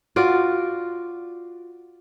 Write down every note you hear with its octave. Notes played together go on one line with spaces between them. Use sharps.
F4 F#4 D5